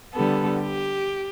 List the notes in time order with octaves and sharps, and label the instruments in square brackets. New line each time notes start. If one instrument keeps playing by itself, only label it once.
[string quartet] D3 G3 B3 A4
G4